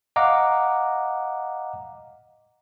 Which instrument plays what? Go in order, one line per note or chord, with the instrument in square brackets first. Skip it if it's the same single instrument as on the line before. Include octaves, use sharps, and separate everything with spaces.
[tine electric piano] D#5 F5 F#5 A#5 D6